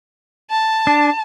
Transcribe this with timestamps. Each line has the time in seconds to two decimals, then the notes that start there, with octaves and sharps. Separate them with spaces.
0.51 A5
0.87 D4